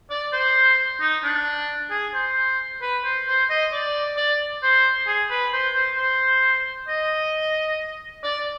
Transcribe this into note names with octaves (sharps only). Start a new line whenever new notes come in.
D5
C5
D#4
D4
G#4
C5
B4
C5
C5
D#5
D5
D5
C5
G#4
B4
C5
C5
C5
D#5
D5